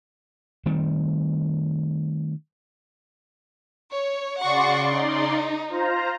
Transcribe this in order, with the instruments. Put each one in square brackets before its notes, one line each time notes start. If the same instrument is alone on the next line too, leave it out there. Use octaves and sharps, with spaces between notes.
[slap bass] D#3 G3 A3 C4
[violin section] C#5
[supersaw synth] C#3 D5 C6 [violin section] F#4 F#5 C#6
[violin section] D#4
[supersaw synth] F4 C5 A#5